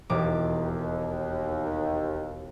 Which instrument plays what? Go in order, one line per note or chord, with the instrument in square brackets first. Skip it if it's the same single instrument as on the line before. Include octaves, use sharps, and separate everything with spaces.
[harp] E1 D#4 D6 [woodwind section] D#2